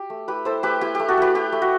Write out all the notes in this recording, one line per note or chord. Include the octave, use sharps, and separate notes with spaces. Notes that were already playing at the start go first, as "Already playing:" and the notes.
Already playing: G4
A3
E4 G4 B4
E4 A4 C5
A3 G4 B4
E4 G4
A3 G4
F#4 A4
A3 G4 B4
E4 G4
A3
F#4